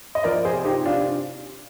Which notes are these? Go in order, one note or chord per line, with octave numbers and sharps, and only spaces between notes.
D#5
F3 A#4 D5
G#4 C5
C3
D#4 G4
C3
D4 F4